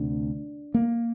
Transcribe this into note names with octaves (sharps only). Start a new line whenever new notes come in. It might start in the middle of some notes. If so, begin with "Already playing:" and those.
Already playing: D2 C3 D4
A#3